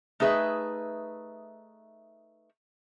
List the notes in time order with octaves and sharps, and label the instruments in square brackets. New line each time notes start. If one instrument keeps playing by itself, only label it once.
[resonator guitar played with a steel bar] A3 D#4 G#4 B4 E5